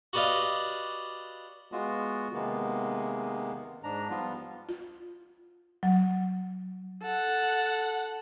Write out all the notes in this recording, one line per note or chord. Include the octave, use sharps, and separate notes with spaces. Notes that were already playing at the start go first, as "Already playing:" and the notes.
F#4 G4 B4 D5 D#5 F5
G#3 B3 F4 F#4
C3 D#3 G#3 A#3 B3
G#2 D4 A#5
F3 G3 B3 F4
F4
F#3
A4 F#5